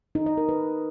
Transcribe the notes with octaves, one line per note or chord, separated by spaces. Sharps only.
D#4
D#5
A#4
B4